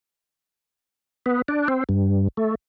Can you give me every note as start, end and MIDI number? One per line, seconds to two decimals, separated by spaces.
1.26 1.42 59
1.48 1.68 62
1.68 1.84 60
1.89 2.28 43
2.37 2.55 57